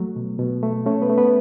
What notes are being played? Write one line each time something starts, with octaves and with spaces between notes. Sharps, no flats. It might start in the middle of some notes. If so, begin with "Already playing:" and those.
Already playing: F#3 A3
B2
B2
A3
A3 C#4 C#5
B3 B4
A3
B3 B4